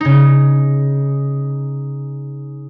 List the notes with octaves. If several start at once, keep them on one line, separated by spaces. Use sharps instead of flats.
C#3 D#4